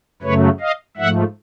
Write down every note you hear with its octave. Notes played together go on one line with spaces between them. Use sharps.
F#2 C#3 F#3 A3 B4 C#5
D#5 F5
G#2 F3 A3 E5 F#5